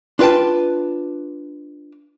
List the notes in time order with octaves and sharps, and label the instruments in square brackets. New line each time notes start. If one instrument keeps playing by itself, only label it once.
[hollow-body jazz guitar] D4 F4 B4 G5 A5